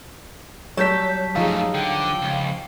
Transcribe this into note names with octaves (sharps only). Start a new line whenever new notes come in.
F#3 G3 C#5 A5 G6 B6
F#2 F3 A3 D#4 G#4 F5
D3 G5
C#2